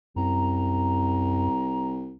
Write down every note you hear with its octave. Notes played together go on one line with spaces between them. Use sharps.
C2 F#2 A#5